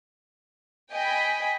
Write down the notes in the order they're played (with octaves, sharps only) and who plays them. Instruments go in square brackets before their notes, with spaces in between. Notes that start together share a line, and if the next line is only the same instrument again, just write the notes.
[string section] D#5 G5 G#5 B5